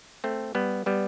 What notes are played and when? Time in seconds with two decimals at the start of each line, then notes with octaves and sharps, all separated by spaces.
0.24 A3 C4
0.55 G3 B3
0.86 G3 B3